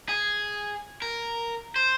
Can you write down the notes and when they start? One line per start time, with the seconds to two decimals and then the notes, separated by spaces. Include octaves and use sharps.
0.09 G#4
1.02 A#4
1.76 C5